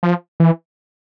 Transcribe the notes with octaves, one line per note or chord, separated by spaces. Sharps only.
F3
E3